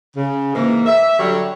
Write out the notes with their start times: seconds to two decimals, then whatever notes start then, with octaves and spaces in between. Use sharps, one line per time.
0.16 C#3
0.55 G#2 E3 A#3
0.86 E5
1.19 D3 F#3 G3 D4 C#5